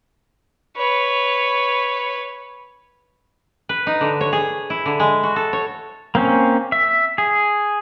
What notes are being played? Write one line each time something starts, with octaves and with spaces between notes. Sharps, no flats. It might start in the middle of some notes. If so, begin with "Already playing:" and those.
B4 C#5
B4
D#4
D3
C#5
G#4
E4
D3
G#3
F#4
A4
C#5
A#3 C4 C#4
E5
G#4